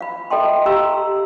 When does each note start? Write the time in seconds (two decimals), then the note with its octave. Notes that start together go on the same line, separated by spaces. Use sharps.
0.01 F5 B5
0.30 A4 D#5 E5 G5 A5 C6
0.66 G4 F5 A#5 C6 E6